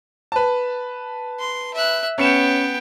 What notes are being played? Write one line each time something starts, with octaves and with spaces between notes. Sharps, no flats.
B4 A5
C6
E5 F#6
B3 C#4 G5 C#7 E7